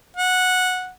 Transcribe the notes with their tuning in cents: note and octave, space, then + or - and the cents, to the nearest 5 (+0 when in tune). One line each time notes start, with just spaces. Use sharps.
F#5 -10